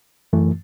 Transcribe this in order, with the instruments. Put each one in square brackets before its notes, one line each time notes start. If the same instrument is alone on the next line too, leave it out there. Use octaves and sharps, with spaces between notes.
[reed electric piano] F#2 E3 A3